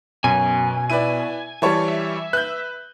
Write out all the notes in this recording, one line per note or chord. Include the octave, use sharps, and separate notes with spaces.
F#2 B2 G#5
E4 B4 D5 D#7
E3 G3 C#5 A5
E5
B4 F#6 G6